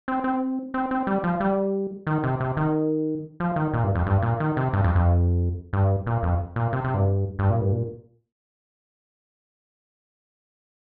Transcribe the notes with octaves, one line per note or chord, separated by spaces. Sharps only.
C4
C4
C4
C4
G3
F3
G3
D#3
C3
C3
D#3
F3
D#3
A#2
G2
F2
G2
A#2
D#3
C3
G2
F2
F2
G2
A#2
F2
A#2
C3
C3
G2
G2
A#2
G2
A#2